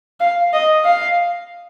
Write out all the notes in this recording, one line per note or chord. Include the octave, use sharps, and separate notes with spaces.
F5
D#5
F5